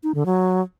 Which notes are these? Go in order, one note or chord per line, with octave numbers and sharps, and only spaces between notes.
D#4
D3
F#3